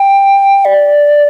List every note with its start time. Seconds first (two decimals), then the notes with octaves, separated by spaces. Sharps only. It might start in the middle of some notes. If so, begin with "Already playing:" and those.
Already playing: G5
0.65 D5